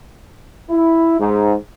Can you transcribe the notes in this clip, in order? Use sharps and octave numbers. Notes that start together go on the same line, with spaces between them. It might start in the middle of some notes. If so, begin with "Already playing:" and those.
E4
G#2